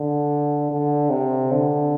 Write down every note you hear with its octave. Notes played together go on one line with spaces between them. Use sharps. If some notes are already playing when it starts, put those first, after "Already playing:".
Already playing: D3
D3
C3
D3